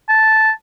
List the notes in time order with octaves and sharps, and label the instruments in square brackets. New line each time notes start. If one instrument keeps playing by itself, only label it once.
[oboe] A5